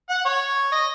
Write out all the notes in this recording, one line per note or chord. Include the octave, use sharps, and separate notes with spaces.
F#5
C#5
D#5